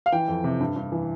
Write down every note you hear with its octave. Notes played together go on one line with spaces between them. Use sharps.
F5
E3 G5
F2
C3
G2
G2
E3